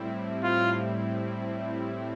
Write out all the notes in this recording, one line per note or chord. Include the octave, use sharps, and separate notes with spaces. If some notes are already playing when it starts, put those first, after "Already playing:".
Already playing: A2 G3 C4 E4
F4